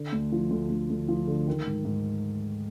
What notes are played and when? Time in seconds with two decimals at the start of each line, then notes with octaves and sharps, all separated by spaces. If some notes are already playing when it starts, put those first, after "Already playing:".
Already playing: D3
0.13 D2
0.32 F3
0.51 D2
0.70 D2
0.90 D2
1.09 F3
1.27 D3
1.48 D#3
1.67 G#2
1.85 G#2